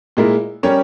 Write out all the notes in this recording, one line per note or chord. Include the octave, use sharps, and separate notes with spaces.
A#2 G#3 E4 A#4
G3 C#4 G4 A#4 C#5